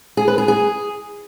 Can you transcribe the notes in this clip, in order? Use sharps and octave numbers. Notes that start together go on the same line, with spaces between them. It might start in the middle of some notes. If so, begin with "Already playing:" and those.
G#4
B4
G#4
G#4